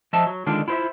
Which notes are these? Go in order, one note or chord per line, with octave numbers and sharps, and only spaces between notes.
F3 D#5 E5 A5
F#3
D3 D#3 G#3 D4 F4
E4 F4 C5 D#5 E5